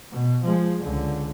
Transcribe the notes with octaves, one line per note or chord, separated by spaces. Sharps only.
B2
F3 G#3
C#2 D3